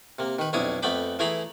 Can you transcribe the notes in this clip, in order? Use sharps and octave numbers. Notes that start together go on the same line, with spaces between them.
C3 A#3
D#3 B4
B1 F2 D4 E4 C#5 D#6
F2 A3 B3 G5 B5 D6
E3 A3 E4 G#4 A#5 B5